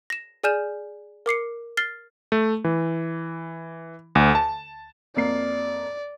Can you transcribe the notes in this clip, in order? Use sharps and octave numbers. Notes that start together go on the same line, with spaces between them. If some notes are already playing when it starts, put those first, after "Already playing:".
A#6 E7
G#4 D5 G#5 F6 G6 E7
A#4 D6 C7 C#7
F6 A6 C7 G7
A3
E3
D2
A5
F2 A#3 D5 C7